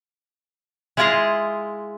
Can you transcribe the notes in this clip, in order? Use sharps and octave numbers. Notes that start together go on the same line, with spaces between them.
G#3 E4 F4 G#4 D#5 F5